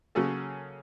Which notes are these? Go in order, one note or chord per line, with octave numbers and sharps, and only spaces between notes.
C#3 F#3 A#3 C#4 G#4 A4